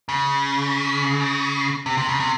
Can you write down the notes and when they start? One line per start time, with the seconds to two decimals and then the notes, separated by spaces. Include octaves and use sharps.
0.09 C#3
1.86 C3
1.98 C3
2.09 C#3
2.20 C3